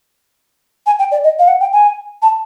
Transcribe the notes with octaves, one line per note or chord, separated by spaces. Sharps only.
G#5
G5
D5
D#5
F5
F#5
G5
G#5
A5